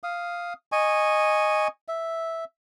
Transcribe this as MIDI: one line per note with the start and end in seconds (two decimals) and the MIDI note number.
0.03 0.53 77
0.03 0.53 87
0.72 1.68 75
0.72 1.68 80
0.72 1.68 85
1.88 2.45 76